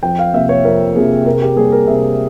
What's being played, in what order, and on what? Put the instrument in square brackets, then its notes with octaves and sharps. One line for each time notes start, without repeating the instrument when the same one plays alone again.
[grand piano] F2 G5
F5
C3 F3 A#3 E5
C#5
F2 A#4
C3 F3 A#3 G#4
C3 A#4
G#4
G4
G3 A#3 G#4
A#4
C3 E5